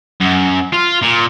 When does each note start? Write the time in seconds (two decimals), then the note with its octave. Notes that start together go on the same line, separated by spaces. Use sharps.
0.20 F#2
0.73 F4
1.02 A#2